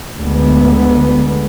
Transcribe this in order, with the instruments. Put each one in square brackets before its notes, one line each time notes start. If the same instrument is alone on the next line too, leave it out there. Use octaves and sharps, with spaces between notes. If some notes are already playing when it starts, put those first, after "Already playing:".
[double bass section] D2 D3 G#3 B3